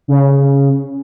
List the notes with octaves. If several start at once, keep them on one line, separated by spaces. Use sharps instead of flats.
C#3